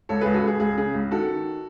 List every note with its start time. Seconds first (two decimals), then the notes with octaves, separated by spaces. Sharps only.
0.09 C#2 A4 C#5
0.21 C#2 G#4 B4
0.34 F#4 A4
0.42 C#2 G#4
0.60 C#2 G#4
0.78 C#3 G#4
0.94 C#2
1.11 D#3 F#4 A4
1.28 D#3